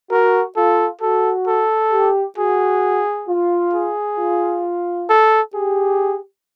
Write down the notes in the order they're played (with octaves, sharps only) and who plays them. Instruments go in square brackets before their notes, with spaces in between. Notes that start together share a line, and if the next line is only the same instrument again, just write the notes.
[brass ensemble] F#4 [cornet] A#4
[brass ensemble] F4 [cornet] A4
[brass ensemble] F#4 [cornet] A4
[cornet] A4
[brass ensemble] G4
[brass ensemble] F#4 [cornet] G#4
[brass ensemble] F4
[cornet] G#4
[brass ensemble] F4
[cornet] A4
[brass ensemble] G4 [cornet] G#4